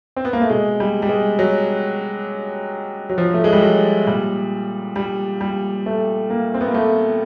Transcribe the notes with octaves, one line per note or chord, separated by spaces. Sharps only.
C4
B3
A#3
A3
B2 G#3
G3
G3
G#3
F#3
F#3
F3
A3
G#3
G3
F#3
A#2 G3
G3
G3
A3
A#3
C4
B3
A#3
A3